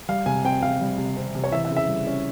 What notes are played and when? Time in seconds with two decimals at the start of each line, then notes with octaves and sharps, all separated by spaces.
0.09 G3 F5
0.26 C3 G#5
0.45 C4 G5
0.62 C3 F5
0.81 G3
0.98 C3
1.17 C4
1.35 C3
1.44 C#5
1.52 E3 E5
1.65 E5
1.71 C#3
1.77 E5
1.88 G3
2.07 C#4